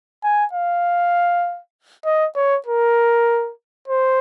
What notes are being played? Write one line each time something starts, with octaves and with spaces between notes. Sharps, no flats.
G#5
F5
D#5
C#5
A#4
C5